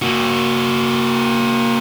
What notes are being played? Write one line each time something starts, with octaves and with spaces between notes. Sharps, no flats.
A#3 F#4